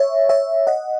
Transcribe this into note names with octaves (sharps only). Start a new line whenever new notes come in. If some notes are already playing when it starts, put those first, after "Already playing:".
Already playing: C#5 E5
C#5 E5
D#5 F#5